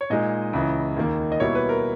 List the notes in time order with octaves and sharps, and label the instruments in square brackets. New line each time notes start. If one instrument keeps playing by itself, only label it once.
[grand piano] C#5
A#2 G#3 D#4 D#5
C#2 C#3 E3
D#2 D#3 A#3
D#5
B2 G3 A#3 E4 C#5
B4
A#4